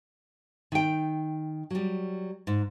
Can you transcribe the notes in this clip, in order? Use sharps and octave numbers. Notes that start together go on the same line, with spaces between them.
D#3 G5
F#3 G3
G#2